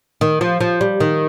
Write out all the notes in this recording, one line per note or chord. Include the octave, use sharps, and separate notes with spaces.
D#3
F3
F3
G3
D#3